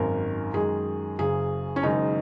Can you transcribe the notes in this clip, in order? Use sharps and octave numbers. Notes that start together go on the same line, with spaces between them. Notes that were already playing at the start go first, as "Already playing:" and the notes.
Already playing: G#1 F#2 D#3 A#4
F#2 D#3 G#3 G#4
F#1 F#2 C#3 G#4
C#4
F#1 F#2 D#3 G#3 D#4